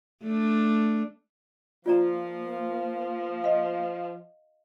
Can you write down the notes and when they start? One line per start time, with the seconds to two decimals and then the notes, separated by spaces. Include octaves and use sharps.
0.23 A3 D4
1.86 F3 A#3 F4 D5 A#5
3.44 D#5 F5